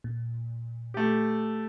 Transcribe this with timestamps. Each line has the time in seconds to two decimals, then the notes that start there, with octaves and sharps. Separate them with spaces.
0.04 A#2
0.94 A3 G4